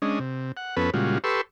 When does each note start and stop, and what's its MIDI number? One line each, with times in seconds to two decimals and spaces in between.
0.02 0.19 56
0.02 0.19 61
0.02 0.19 62
0.02 0.19 75
0.19 0.52 48
0.57 0.76 78
0.76 0.90 41
0.76 0.90 59
0.76 0.90 61
0.76 0.90 69
0.76 0.90 71
0.94 1.18 46
0.94 1.18 49
0.94 1.18 55
0.94 1.18 56
0.94 1.18 65
0.94 1.18 66
1.24 1.41 67
1.24 1.41 69
1.24 1.41 71
1.24 1.41 84
1.24 1.41 85
1.24 1.41 88